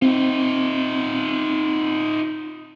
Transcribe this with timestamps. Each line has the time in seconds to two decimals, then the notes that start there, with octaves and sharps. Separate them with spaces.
0.02 C4 D#4 F4